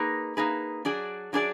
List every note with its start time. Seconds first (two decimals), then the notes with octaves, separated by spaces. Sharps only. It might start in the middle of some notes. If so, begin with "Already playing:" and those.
Already playing: A#3 D#4 G#4 B4
0.37 A#3 D#4 G#4 B4
0.85 F#3 D4 G#4 D5
1.33 F#3 D4 G#4 D5